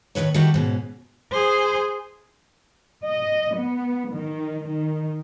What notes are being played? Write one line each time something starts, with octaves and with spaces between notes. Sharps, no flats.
A2 D#3 F#3 B4 C#5
D#3 G3 A3 E4 F#4 G4
G#2 B2 C#4
G#4 C5
D#5
B3
D#3
D#3